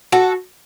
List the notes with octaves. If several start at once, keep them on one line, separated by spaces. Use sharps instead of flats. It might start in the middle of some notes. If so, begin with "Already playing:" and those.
F#4 A4